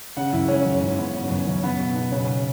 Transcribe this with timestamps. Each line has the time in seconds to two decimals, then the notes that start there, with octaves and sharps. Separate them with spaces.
0.17 C#3 F#5
0.33 F#2 E4
0.48 G#3 C#4
0.65 F#3
0.81 G#2
0.98 B3
1.14 C#3
1.30 F#2
1.47 F#3
1.63 B3
1.79 B2
1.95 B2
2.12 C#3 C#4